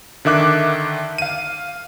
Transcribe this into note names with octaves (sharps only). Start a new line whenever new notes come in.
D3 D#3 E5 D6 F#6
F5 D#7